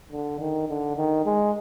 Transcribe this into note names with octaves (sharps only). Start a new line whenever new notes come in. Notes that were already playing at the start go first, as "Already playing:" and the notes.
D3
D#3
D3
D#3
G#3